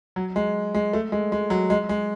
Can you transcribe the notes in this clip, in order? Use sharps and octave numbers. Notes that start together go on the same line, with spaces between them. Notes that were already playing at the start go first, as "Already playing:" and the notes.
F#3
G#3
G#3
A3
G#3
G#3
F#3
G#3
G#3